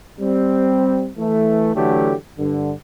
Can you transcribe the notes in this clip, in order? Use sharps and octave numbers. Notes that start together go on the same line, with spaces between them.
G3 C4
E3 A3
D3 E3 F#3 A3 G4
G2 D3